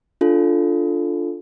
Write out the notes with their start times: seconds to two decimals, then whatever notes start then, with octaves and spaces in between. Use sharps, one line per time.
0.21 D4 F4 A4